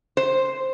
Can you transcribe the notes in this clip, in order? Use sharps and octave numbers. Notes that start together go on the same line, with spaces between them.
C5